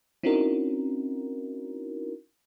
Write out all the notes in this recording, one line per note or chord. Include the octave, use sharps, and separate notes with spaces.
C4 C#4 D#4 E4 F#4 A#4